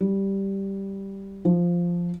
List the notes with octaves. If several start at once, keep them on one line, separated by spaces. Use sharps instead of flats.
G3
F3